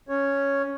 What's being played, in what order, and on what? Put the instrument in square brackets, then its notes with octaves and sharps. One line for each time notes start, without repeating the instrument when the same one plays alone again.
[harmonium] C#4 C#5